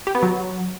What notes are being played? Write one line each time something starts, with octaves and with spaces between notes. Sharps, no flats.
G4
B3
F#3